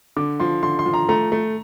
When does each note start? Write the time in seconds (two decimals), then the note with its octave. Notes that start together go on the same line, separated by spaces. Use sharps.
0.17 D3 D6
0.40 F3 C6
0.63 D3 C6
0.79 C6
0.86 F3
0.94 A#5
1.09 A3 A#5
1.32 A3